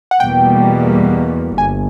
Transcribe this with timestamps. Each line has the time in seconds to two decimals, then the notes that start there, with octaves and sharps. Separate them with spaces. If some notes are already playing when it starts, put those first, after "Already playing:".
0.11 F#5
0.20 E2 B2 G3 A#3 G5
1.58 G1 G#5